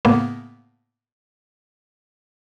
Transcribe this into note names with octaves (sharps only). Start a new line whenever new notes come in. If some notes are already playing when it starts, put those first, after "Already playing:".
A2 C#3 A#3 B3